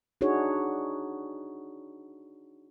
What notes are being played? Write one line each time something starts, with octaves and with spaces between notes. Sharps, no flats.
D4 D#4 F#4 G#4 C#5